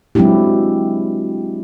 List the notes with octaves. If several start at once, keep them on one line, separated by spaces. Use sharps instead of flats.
F#3 G#3 C4 D4 E4 G4